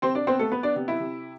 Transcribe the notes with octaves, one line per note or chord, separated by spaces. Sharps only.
C3 C4 C5
D4 D5
B3 C4 C5
A3 A4
B3 B4
D4 D5
C3
E4 E5
C3